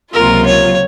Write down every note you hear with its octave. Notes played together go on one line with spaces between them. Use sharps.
C#2 C3 F#3 A#3 F4 A#4
C#5